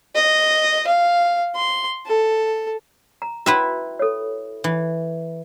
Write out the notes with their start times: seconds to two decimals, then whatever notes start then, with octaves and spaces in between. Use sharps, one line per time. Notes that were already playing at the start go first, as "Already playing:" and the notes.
0.15 D#5
0.87 F5
1.56 C6
2.06 A4
3.22 A#5
3.46 E4 F#4 B4 E5 G5
3.99 A4 C#5
4.64 E3